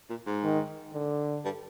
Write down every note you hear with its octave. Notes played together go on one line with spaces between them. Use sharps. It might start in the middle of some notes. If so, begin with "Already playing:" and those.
A#2
G#2
D#3
D3
G2